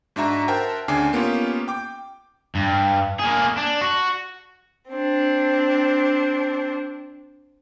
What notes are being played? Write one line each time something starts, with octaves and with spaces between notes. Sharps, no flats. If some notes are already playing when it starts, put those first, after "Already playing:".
G#2 D4 F#4 E5 A#5
A#4 C5 E5 F#5 G5 A5
D2 C#3 D4 G#5 D6 C7
A#3 B3 C#4 F4 G4
G5 D6
G2
A#3 G#4
D4
F#4
C4 D4